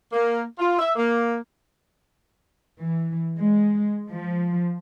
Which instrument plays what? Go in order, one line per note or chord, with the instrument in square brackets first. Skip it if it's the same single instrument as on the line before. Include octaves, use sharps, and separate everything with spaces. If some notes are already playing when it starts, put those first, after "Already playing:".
[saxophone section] A#3
F4
E5
A#3
[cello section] E3
G#3
F3